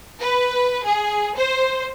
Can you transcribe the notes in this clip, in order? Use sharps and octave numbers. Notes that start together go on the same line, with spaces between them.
B4
G#4
C5